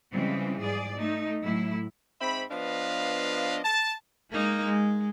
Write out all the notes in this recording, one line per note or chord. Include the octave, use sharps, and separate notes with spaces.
C#3 E3 F3 G3 G#3 C4
G#2 G#4 D5
A3 D#4
A2 F#3 E4
G#2 C4 E5 B5
F3 B3 D4 B4 D#5 F5
A5
G#3 A#3 D#4
G#3